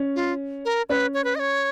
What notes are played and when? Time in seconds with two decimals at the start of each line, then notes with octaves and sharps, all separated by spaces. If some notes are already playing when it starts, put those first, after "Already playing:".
Already playing: C#4
0.16 F4
0.65 A#4
0.89 C#4 B4
1.14 C#5
1.24 B4
1.35 D#5
1.39 C#5